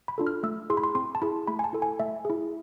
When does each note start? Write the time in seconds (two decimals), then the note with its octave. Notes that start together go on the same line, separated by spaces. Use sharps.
0.08 B5
0.18 D4 F4 A4
0.27 F6
0.43 A3 E6
0.70 E4 G#4 C6
0.77 B5
0.84 C6
0.95 C4 C6
1.15 A5
1.22 E4 G#4 B5
1.47 A3 B5
1.59 G#5
1.64 A5
1.73 E4 A4
1.82 G#5
1.99 A3 E5
2.25 E4 G#4